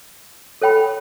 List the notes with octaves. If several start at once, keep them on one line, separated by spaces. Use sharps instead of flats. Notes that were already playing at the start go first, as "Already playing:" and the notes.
A4 C#5 G5 B5